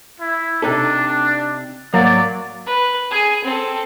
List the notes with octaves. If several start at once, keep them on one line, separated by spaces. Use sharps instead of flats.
E4
C3 D4 D#4 A4
G#2 F#3 A#3 D5
B4
G#4 G#5
C4 A4